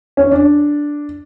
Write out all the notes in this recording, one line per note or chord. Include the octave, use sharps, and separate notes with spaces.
C#4
D4